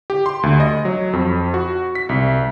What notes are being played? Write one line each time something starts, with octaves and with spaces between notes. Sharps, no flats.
G4
C6
D2
D#5
F#3
F2
F#4
B6
C2